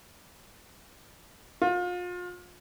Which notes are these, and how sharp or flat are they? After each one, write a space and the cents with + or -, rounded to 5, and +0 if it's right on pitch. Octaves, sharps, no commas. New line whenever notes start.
F4 +35